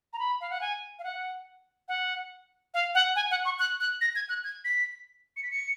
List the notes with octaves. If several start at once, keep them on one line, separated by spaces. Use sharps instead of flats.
A#5
B5
F5
F#5
G#5
F5
F#5
F#5
F5
F#5
G#5
F#5
C#6
F#6
F#6
A#6
G#6
F#6
G#6
B6
C#7
B6
C#7